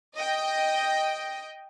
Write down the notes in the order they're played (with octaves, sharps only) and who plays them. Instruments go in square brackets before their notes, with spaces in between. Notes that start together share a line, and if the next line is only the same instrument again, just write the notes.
[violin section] D#5 G5